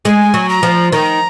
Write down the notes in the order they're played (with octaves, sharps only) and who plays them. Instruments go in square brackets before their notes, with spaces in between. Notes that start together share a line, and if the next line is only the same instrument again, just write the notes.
[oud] G#3 [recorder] G#5
[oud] F#3
[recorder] A#5
[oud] F3
[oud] D#3 [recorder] A#5